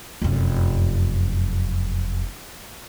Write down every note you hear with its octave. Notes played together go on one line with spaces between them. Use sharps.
F1 F#2